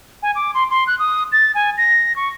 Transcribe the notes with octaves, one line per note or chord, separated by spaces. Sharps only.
G#5
D6
C6
C6
F#6
D#6
A6
G#5
A#6
C#6